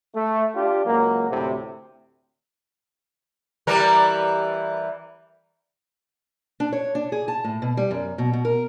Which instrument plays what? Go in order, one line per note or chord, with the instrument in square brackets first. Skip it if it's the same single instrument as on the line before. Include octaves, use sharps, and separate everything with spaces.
[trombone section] A3
D4 F4 G4
C#2 F#3 A#3
D2 A2 C3
[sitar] E3 G3 A#4
[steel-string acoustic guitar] D4
C#5
D4
G#4
A5
A2
B2
G3
F#2
B2
B2
A#4